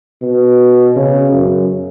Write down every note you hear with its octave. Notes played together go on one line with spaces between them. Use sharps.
B2
C#3
F#2